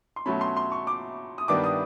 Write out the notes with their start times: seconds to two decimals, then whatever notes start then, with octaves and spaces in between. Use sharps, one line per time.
0.16 C6
0.26 B2 F#3 A3 C#4 B5
0.41 C6
0.57 C6
0.72 C#6
0.87 D6
1.38 D#6
1.48 G2 D#3 G3 B3 D4 D6
1.64 D#6